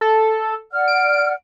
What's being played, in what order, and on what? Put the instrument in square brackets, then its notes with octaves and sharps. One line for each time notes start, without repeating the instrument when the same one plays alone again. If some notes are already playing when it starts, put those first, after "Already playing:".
[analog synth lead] A4
[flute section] D5 F#5 F6
[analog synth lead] D7